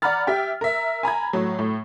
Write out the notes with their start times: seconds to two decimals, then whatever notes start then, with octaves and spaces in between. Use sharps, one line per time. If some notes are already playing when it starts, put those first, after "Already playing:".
0.02 D5 F#5 A#5 B5 F6 A6
0.27 G4 E5 G5
0.61 A#4 E5
1.03 G#5 A#5 B5 G#6
1.33 A2 F#3
1.59 A2